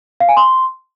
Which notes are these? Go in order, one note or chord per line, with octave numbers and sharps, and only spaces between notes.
F5
G#5
C6